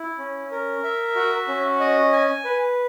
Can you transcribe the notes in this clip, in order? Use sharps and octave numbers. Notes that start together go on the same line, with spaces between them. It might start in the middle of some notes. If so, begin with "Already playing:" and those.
Already playing: E4
C#4
A#4
E5
F#4
C#4
D#5
G#5
B4